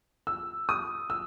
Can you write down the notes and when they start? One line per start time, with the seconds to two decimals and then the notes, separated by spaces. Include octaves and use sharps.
0.27 E6
0.69 D#6
1.10 E6